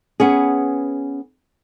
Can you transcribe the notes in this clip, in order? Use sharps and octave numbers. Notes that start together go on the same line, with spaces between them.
B3 C#4 G#4